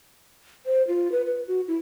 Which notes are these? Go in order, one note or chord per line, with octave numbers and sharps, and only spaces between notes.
C5
F4
B4
B4
F#4
E4